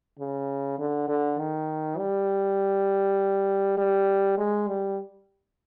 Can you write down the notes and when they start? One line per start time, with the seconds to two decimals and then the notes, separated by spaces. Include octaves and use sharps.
0.19 C#3
0.79 D3
1.08 D3
1.39 D#3
1.98 G3
3.78 G3
4.38 G#3
4.68 G3